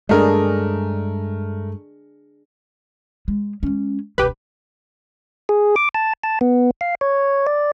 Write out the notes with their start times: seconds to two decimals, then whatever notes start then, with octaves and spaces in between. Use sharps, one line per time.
0.09 G2 G#3 A3 D4 G#4 A#4 D#5
3.28 G#3
3.63 G#3 C#4
4.18 E1 C2 G4 B4
5.49 G#4
5.76 D6
5.95 A5
6.24 A5
6.41 B3
6.81 F5
7.01 C#5
7.47 D5